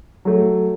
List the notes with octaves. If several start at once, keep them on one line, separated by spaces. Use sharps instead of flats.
F#3 A3